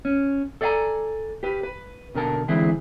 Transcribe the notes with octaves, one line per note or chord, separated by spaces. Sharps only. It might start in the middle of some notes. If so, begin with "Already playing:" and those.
C#4
A4 D5 E5 F5 G#5 A#5
G4 B4
B4
B1 D3 A#4 A5
D3 E3 G#3 C4 E4